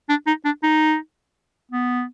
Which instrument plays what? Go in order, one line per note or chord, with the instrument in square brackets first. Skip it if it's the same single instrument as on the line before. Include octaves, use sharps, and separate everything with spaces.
[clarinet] D4
D#4
D4
D#4
B3